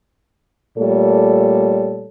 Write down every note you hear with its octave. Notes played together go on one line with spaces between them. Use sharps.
A#2 G3 A3 A4 C#5